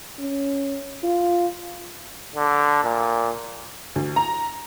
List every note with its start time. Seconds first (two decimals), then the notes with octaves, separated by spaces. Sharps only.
0.19 C#4
1.03 F4
2.35 D3
2.84 A#2
3.96 D2
4.16 A#5